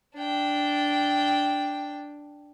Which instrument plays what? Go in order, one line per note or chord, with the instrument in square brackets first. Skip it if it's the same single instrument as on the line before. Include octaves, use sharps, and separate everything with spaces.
[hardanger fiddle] D4 G5